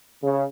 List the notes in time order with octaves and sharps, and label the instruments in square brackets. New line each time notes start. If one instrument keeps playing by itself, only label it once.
[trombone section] C#3